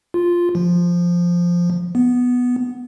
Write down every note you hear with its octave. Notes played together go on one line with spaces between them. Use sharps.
F4
F3
B3